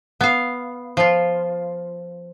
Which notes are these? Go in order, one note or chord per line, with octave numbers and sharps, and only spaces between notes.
B3 F5
F3 F4